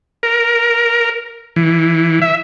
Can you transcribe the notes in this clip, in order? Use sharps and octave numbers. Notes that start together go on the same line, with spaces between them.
A#4
E3
E5